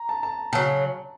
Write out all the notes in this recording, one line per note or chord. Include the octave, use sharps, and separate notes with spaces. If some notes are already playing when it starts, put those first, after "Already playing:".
Already playing: A#5
A5
A5
C#3 F#3 A5